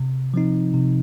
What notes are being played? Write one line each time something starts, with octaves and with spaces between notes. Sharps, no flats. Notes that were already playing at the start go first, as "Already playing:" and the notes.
Already playing: C3
F3 C4 D#4
C3